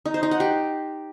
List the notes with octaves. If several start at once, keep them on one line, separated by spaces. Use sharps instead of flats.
D#4
C5
D#4
F#5
G4